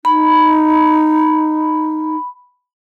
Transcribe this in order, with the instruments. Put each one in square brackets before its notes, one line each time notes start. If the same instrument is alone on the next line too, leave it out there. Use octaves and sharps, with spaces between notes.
[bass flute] D#4 [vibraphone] B5